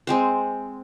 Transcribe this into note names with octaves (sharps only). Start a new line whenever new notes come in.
G#3 C4 C5